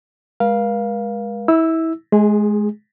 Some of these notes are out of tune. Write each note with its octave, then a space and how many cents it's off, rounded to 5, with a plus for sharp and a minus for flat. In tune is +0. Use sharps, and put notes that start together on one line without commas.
G#3 +0 A#4 +45 F5 +0
E4 -25 E6 +0
G#3 +25 G#4 -15